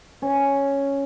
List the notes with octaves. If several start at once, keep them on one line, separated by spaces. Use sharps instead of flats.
C#4